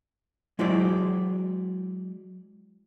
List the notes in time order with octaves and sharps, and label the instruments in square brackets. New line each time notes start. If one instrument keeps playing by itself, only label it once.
[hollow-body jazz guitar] F#3 G#3 E4 F#4 C5 D5